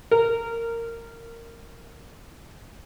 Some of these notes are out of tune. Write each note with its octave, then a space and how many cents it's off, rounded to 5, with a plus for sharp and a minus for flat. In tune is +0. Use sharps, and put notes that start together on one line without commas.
A#4 -15